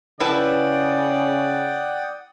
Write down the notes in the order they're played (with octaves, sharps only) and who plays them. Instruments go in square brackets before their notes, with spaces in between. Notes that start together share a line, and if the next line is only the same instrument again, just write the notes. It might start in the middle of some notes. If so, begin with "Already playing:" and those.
[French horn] C#3 [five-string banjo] E4 B4 A5 [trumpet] D5 [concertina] F#5 G5 D#6